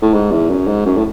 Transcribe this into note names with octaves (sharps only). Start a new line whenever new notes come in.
A2
G#2
E2
F#2
G#2
F#2
A2